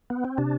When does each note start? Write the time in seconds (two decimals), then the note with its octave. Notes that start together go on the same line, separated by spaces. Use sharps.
0.10 B3
0.25 C4
0.38 C3 D4